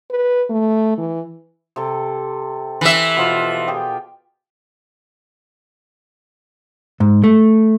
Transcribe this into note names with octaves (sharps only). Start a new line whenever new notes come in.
B4
A3
E3
C3 A4
E3 E5
B2 F3 F4
G4 G#4 G5
G#2
A3